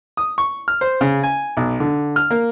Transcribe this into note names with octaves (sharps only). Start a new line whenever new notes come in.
D#6
C#6
F6
C5
C#3
G#5
B1
D3
F6
A#3